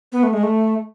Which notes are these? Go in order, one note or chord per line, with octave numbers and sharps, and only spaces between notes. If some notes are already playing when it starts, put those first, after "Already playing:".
B3
A3
G#3
A3